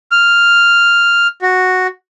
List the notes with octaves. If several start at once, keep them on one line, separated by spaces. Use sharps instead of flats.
F6
F#4